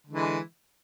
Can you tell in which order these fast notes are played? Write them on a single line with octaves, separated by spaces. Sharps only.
D3 G#3 E3